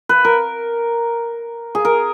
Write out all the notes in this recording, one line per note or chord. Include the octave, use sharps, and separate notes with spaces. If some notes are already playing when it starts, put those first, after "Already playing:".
B4
A#4
G#4
A#4